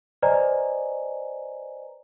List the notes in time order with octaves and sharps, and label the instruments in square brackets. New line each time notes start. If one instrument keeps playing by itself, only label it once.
[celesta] B4 C5 D5 D#5 G#5 A#5